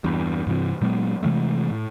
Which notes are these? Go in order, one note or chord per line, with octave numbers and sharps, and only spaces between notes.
E2 G2
G2 C3 E3 C4
A#2 F#3 G#3 B3
C3 E3 G#3 A3
A2